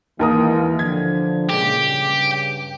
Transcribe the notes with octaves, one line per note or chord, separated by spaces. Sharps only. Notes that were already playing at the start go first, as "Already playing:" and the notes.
D#2 E3 G#3 A#3 A#4 D#6
D3 F3 G#6
A#2 C#3 G#3 G4
G2 C#3